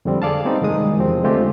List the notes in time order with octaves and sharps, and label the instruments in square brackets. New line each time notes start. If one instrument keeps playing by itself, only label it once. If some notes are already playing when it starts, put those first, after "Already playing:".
[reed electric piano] F2 D3 G3 C4
G#4 A4 D5 F5 A5
G3 B3 C4 D#4
C2 F#2 D#3 G#3 D#6
E2 C3 F3 C4
D3 G#3 A3 C4 F4 G4